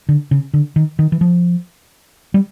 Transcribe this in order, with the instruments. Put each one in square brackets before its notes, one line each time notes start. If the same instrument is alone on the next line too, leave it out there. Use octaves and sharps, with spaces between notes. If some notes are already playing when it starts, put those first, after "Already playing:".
[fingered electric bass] D3
C#3
D3
D#3
D#3
E3
F3
G3